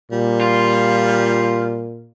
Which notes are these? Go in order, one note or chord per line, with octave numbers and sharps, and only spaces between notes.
A#2 G3
F4